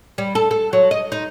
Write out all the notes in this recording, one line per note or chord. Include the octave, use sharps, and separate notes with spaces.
G3
A4
A4
F#3
D#5
D#4